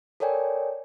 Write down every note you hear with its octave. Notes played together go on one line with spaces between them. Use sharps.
A4 A#4 C#5 D5 G5 G#5